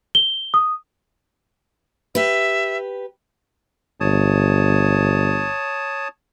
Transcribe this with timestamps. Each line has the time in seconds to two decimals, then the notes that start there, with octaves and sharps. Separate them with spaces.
0.15 G7
0.54 D#6
2.15 G4 B4 E5
4.01 G1 C#5 A5 D#6